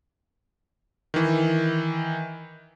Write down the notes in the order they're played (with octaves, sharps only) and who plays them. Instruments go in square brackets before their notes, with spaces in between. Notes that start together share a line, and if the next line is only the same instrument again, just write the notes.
[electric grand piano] D#3 E3